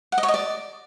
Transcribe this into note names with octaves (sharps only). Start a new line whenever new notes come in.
F#5
D#5
C#5
D#5
D5